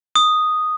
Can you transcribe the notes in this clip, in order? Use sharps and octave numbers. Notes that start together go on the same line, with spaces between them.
D#6